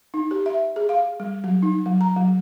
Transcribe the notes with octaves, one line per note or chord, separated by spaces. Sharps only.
D#4
G4
E5
G#4
F5
G3
F#3
D#4
F#3
A#5
F#3